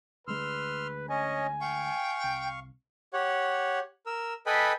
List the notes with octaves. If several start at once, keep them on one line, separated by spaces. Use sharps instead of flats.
D2 G#3 B4 C6 E6 F6
C#4 C#5 D#5 G#5
F5 G5 C#6
C2
G4 C#5 F#5
A#4 E6
A4 B4 D#5 G5 G#5 B5